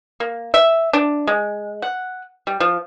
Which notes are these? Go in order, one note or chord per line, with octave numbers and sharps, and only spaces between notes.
A#3
E5
D4
G#3
F#5
G3
F3